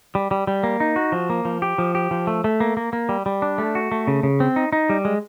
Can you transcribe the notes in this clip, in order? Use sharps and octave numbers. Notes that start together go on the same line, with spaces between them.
G3
G3
G3
A#3
D#4
F#4
F3
A#3
F3
G4
F3
G4
F3
A3
A3
A#3
A#3
A#3
G3
G3
D4
A3
F#4
A3
C#3
C#3
C4
D#4
D#4
G3
G#3